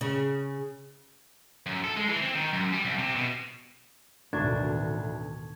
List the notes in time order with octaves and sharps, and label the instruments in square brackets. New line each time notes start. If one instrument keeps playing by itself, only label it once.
[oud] C#3
[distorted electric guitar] F#2
A4
G#3
E3
C4
D#3
F#2
G3
C2
C3
B2
[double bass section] A1 B2 D#3 [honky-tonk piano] D2 [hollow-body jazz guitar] D4 [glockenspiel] A5 C#6 G#6